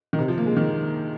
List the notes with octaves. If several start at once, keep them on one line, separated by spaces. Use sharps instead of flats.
D#3
C3
F3
A#3
G#3
D#3